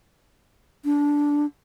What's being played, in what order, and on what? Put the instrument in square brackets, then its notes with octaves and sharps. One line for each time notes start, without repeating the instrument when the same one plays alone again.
[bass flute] D4